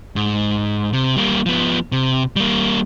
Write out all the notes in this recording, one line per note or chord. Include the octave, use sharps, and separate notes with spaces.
G#2
C3
G3 A#3
F3 B3
C3
G3 A#3